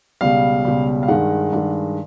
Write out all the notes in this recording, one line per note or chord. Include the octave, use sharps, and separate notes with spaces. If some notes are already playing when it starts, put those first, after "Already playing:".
C#2 B2 G3 F5
C#2 B2 G3
F5
G2 D#3 G#3 F#5
G2 D#3 G#3